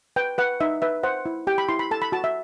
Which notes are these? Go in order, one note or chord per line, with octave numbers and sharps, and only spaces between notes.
B4 G5
B4 F#5
D#4 E5
B4 E5
C5 F#5
E4
G4 G5
B5
E4 C6
B5
A4 A5
B5
F#4 A5
E5